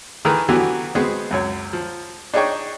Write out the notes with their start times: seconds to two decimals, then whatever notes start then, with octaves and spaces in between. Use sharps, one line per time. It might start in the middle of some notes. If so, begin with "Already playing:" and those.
0.25 D#3 E3 A3 G#4 A#4 B4
0.49 D3 E3 F#3 B3 F#4 G4
0.95 G#3 B3 C4 F#4 G#4
1.31 C#2 F#2 C#5
1.73 F3
2.34 D4 D#4 G#4 C#5 G5 C#6